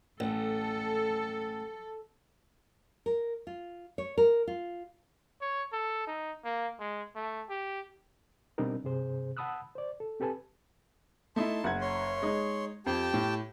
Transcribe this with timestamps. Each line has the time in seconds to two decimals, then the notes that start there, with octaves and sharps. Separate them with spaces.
0.20 A1 A4
3.06 A#4
3.47 F4
3.98 C#5
4.18 A#4
4.47 F4
5.42 C#5
5.73 A4
6.07 D#4
6.45 A#3
6.80 G#3
7.16 A3
7.50 G4
8.58 B2 G3 C4 D4 D#4 A#4
8.84 G2 C3 G#4 C5
9.37 F#5 A5 B5 D#6 E6 F#6
9.75 C5 D5
10.00 A4
10.20 C4 G4 A4 B4 G#5 A5
11.36 A3 D#4 E4 A5 C6
11.64 F#1 F#5 G#6
11.81 C#5 C6
12.22 G#3 D#4
12.86 F2 G4 G5 A5
13.14 A2